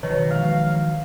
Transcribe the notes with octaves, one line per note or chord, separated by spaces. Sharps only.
B2 D#3 E3 F#3 F#4 B4 C#5 D#5
F3 G#3 F5